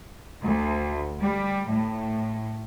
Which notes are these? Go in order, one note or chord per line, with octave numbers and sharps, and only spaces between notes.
D2
G3
A2